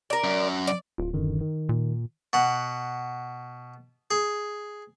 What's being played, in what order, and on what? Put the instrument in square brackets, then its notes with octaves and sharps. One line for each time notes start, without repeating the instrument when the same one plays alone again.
[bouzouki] A#4 D5
[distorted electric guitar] F#2
[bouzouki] D5
[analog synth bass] D1 [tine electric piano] F4
[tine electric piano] F#2 D3 D#3
D#3
[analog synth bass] A#2
[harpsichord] B2 F#5
G#4